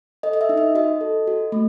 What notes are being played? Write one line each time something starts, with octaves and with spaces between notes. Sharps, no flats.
A4 D#5
D#5
E5
D#4
D#5
F#4 D#5
A4
F#4
A3